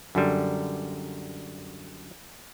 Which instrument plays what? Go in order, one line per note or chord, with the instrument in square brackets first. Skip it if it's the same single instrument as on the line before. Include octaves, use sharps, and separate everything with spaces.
[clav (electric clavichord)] F#2 D3 G3